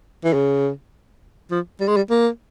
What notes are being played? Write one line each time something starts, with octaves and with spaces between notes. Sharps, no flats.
E3
C#3
F3
G3
G#3
G3
A#3